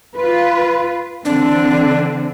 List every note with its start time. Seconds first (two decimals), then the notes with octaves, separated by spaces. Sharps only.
0.16 F4 B4
1.25 D3 E3 C4 D4